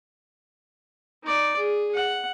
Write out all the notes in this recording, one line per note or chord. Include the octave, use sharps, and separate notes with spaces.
D#4 D5
G#4
F#5